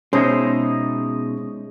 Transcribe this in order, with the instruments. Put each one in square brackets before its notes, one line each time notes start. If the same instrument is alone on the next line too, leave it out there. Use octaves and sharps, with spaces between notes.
[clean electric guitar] B2 D#4 [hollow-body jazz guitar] G#3 [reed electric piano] C#4 [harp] C5 C#5 E5